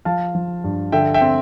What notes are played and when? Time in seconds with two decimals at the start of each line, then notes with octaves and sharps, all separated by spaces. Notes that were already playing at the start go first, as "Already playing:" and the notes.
0.05 F3 F5 A5
0.35 F3
0.64 G2
0.92 D3 E5 G5
1.14 E5 G5
1.21 C4